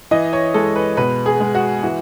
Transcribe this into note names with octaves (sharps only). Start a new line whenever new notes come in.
E3 D#5
C#5
G#3 A4
B4
B2 B4
G#4
G#3
F#4
E3 F#4